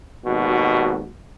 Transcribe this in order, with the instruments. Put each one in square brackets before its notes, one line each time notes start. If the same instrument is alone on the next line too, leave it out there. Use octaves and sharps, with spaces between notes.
[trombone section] G#1 D#2 B2 F#4